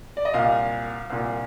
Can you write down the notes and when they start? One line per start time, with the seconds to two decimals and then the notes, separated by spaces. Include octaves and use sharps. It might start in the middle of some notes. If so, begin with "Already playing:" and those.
0.17 D5
0.25 D#5
0.34 C2 A#2 F5
1.10 C2 A#2